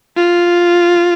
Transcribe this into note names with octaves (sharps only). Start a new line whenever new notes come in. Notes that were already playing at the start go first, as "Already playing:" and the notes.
F4